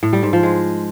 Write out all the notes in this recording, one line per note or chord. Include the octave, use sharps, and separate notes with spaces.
A2
G3
G#2
F3
G#3